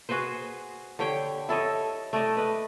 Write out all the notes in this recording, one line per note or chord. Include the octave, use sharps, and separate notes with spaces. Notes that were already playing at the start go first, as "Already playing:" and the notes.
F#4 G#4 B4 C5
D3 G4 C#5 G5
E4 A4 C#5 D#5
A3 D5 D#5
B4 D#5